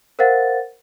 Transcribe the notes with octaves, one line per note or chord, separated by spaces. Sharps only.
A#4 C5 F5 F#5 A6